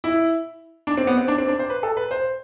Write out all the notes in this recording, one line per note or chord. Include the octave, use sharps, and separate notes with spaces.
E4
D4
C4
B3
C4
D4
C4
D4
C5
B4
A4
B4
C5